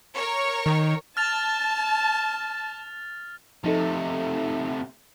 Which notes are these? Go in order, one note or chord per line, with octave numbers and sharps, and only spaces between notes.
A#4 C#5
D#3
A5 F6 A6 F7
C3 F3 A3 D#4 A4